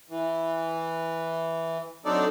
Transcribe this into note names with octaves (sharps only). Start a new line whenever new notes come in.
E3
F#3 C4 D4 D#4 A4 D5